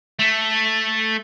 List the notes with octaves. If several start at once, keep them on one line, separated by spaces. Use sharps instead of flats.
A3